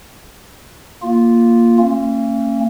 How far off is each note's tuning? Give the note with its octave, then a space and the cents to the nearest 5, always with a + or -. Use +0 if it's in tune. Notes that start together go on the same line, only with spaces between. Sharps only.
A#3 +0 F4 +0
A#3 -45 C#4 -30